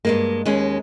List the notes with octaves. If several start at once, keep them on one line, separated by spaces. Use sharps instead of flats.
G2 G#3 A#3
D#2 G#3 C#4